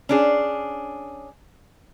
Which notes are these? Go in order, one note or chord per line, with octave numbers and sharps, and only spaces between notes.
C#4 D4 G#4